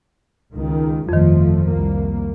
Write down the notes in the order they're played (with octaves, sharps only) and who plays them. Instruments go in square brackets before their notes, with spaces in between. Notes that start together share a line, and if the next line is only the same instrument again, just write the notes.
[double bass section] C#2 D#3
[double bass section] G1 F3 A3 [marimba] F2 D#3
[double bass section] C2 A#3